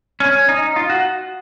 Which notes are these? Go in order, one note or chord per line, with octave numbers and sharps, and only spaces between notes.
C#4
D#4
F4
F#4